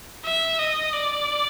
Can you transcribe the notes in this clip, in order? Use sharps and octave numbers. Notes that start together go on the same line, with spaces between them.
E5
D#5
D5